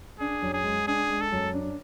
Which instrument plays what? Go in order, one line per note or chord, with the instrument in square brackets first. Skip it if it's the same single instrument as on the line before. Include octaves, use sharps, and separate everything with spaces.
[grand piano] D4 [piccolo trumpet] G#4
[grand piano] F#2
[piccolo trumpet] G#4
[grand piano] G#3
[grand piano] D4 [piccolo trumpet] G#4
[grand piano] G#3
[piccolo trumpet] A4
[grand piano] F#2
D4